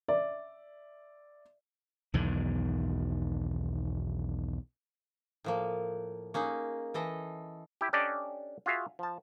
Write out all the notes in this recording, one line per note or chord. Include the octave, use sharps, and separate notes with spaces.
D5 E5
B1 E2 G#2 D#3
A2 F3 A#3
A#3 C#4 D#4 G#4
E3 A4 D#5
E4 G4
C#4 D4 G4 A4 D5 D#5
F4 F#4 G#4 E5 F5
F3 A5